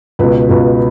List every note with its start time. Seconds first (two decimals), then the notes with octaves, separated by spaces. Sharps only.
0.19 C#2 B2 B4
0.49 C#2 B2